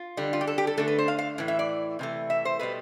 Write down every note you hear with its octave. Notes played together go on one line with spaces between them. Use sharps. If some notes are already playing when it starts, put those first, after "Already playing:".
Already playing: F4
D3 G3
F4
G4
A4
G4
A4
D3 A3 A4
B4
C5
F5
F5
A2 E3
E5
D5
C3 E3 A3
E5
C5
B2 G3 B4